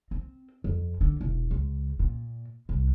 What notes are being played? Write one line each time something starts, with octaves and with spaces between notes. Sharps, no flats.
C4
F2
D3
E1
C#2
A#2
C2